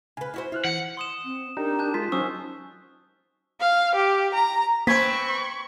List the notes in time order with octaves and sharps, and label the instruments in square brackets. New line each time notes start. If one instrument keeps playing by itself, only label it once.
[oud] C#3 B4 [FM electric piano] G#5
[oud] E4 F#4 C5
[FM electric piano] E4 F6 F#6 [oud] F4
[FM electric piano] E3 [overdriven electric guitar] F#5
[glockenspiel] C6 D#6 E7
[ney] C4
[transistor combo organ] D4 G4 [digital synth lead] D#4 [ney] A#4
[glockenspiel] A5 F#6 G6
[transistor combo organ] G#3 [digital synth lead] F4 [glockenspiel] B6
[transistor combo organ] F#3 C5 [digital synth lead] C#4 [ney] D#4 [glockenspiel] C#6 D#6 E6
[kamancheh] F5
G4
A#5
[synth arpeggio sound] A#3 [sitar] C4 B4 [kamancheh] B5 C#6 [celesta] G#6 B6